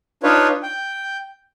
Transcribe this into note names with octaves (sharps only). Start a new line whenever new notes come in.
D4 D#4 F4 B4 C#5
G5